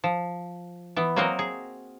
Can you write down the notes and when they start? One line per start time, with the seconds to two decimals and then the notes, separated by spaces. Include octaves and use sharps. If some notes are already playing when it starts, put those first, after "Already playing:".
0.04 F3
0.96 E3 B3
1.16 F#3 A#3 C4 F#4 A#4 D#5
1.39 G#4